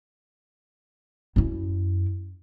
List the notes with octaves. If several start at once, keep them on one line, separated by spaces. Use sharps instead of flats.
F#2 E4